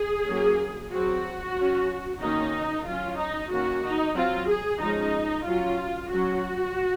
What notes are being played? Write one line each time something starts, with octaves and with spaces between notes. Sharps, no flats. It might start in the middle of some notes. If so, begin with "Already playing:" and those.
Already playing: G#4
F#3 A#3 C#4
F#3 C4 F#4
F#3 C#4
D#3 A#3 C#4 D#4
F#3 C#4 F4
D#4
D#3 A#3 C#4 F#4
D#4
F#3 C4 F4
G#4
F3 G#3 C#4 D#4
F#3 C#4 F4
F#3 C#4 F#4